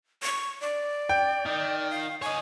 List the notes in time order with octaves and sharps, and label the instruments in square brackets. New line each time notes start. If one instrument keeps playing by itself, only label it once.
[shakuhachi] C#6
D5
[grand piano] G5
[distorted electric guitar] D#3
[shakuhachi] F5
[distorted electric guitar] C#5 D#5 [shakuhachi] G#5